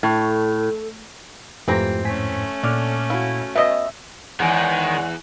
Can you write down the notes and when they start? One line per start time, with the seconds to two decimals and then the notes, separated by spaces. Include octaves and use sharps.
0.03 A2 A4
1.68 F2 G#2 E3 A3 C4 F4 G4 A#5
2.05 A2 A3 C#4 G#5 B6
2.63 A#2 D3 D5 D6 F6
3.10 E4 F#4 F5
3.55 B2 D#5 E5 E6
4.40 E2 D#3 G#3 C#5 F#5